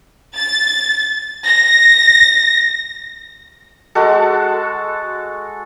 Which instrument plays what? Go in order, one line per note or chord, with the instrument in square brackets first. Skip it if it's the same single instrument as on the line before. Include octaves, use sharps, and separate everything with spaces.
[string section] A6
A#6
[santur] G#3 F#4 A4